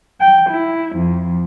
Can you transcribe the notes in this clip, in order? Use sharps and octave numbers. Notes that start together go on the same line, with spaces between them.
G5
E4
F2